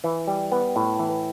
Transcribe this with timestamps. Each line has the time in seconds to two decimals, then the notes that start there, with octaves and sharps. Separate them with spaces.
0.04 E3
0.27 G3
0.52 B3
0.76 A2
0.99 E3